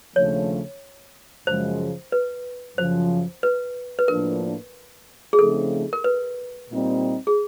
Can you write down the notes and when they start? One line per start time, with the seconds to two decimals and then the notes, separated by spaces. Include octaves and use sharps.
0.15 D#2 C#3 F3 A3 D4 C#5
1.47 F#2 C#3 F3 G#3 C5
2.12 B4
2.77 F#2 C#3 F3 C5
3.43 B4
3.99 B4
4.08 A2 F3 A#3 D4 A#4
5.33 G#4
5.39 C#3 F3 A3 C4 D#4 A4
5.93 A#4
6.04 B4
6.70 A#2 G3 C4 D#4
7.27 G#4